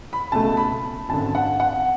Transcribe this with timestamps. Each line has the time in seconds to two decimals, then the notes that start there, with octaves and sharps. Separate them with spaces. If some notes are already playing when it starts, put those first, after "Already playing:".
0.13 B5
0.32 C#2 B2 A3 A5
0.57 B5
1.09 G#1 F#2 D3 A5
1.35 F#5
1.60 F#5